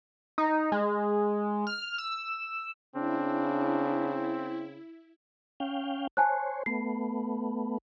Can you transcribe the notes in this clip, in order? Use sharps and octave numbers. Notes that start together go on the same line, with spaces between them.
D#4
G#3
F6
E6
C#3 C4 D4 E4
C#4 F5 G5
C5 C#5 G#5 A5 F#6
A3 B3 C7